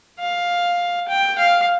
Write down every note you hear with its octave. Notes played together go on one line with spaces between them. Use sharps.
F5
G5
F5